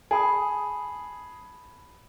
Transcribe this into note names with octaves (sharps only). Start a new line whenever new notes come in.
G#4 A5 B5 D#6